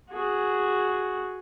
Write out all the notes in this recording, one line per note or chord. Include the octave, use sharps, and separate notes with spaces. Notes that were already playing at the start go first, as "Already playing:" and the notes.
F#4 G#4